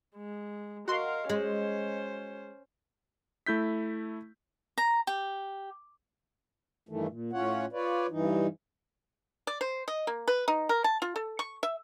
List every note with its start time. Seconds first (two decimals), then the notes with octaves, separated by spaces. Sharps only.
0.16 G#3
0.88 F#4 A#4 D#5 F5 C6
1.30 G#3 C#4 C5
3.46 A3 E4 G6 B6
4.78 A#5
5.07 G4
6.89 G2 D#3 E3 A3
7.09 A#2
7.33 A2 C#4 F4 C#5 F#5
7.73 F4 B4 C#5 D5
8.10 G2 E3 D#4
9.47 D5
9.61 C5
9.88 D#5
10.07 A#3
10.28 B4
10.48 D#4
10.69 A#4
10.84 A5
11.02 F4
11.16 A4
11.39 C#6
11.63 E5